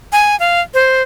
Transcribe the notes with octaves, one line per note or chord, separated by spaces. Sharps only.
G#5
F5
C5